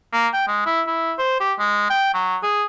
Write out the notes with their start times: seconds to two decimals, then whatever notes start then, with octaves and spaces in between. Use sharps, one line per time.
0.13 A#3
0.33 G5
0.48 G#3
0.66 E4
0.87 E4
1.18 C5
1.40 G4
1.59 G#3
1.90 G5
2.14 F#3
2.43 G#4